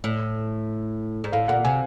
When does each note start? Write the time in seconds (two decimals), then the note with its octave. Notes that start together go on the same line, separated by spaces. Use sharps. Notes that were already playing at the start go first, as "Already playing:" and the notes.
0.04 A2
1.24 G#2
1.32 A2 F5
1.48 A#2 F#5
1.64 C3 G#5